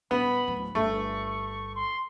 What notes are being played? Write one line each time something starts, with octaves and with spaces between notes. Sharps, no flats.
D#1 B3 B5
D1
G1 A3 C#6
C6